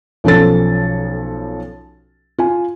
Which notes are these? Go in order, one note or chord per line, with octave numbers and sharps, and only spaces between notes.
B1 F3 C#4 A4 A6
F4 G#5